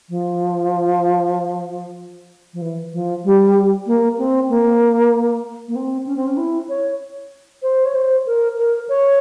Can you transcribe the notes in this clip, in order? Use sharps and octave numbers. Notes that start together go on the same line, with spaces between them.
F3
F3
E3
F3
G3
A#3
C4
A#3
A#3
C4
C#4
C4
C#4
E4
C#5
C5
C#5
C5
A#4
A#4
C#5